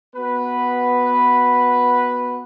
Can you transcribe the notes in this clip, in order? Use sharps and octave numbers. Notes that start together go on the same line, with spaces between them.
B3 F#4 B4